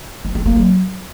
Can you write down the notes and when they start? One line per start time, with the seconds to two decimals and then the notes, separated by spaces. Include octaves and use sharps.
0.25 C4
0.35 C4
0.46 A#3
0.56 F#3